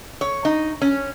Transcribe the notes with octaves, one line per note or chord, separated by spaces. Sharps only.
C#5
D#4
C#4